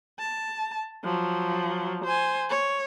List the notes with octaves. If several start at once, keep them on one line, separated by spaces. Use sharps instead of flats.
A5
F3 F#3
C5 G#5
C#5